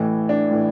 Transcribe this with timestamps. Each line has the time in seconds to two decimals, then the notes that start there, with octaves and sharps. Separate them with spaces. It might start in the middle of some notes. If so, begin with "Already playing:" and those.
Already playing: A1 A2 E3
0.29 D4
0.51 A2 E3